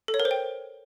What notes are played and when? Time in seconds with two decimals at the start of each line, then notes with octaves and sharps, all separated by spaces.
0.08 A4
0.14 C#5
0.20 A#4
0.25 C5
0.31 G5